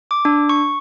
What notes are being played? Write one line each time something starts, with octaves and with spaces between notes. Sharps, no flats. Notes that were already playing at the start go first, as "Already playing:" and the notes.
D6
D4
C#6